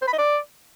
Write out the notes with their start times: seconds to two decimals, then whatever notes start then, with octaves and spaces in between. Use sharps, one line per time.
0.02 C5
0.07 B5
0.13 D#5
0.18 D5